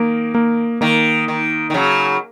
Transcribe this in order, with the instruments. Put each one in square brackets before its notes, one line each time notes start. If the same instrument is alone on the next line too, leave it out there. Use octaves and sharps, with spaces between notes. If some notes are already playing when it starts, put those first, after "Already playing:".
Already playing: [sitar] D#3 [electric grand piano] A#3
[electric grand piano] A#3
[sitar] D#3 [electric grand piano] A#3
[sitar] D#3
D#3
C#3 F#3